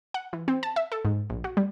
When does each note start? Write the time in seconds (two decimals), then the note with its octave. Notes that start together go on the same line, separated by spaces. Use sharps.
0.14 F#5
0.33 E3
0.48 C4
0.63 A5
0.76 E5
0.92 A4
1.05 G#2
1.30 A#1
1.44 F#4
1.57 G3